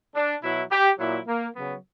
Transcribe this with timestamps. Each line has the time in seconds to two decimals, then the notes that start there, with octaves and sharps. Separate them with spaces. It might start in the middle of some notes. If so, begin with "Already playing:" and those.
0.15 D4
0.43 B2 F#3 E4
0.71 G4
0.99 A#2 F#3 E4
1.28 A#3
1.56 C#3 F#3 B3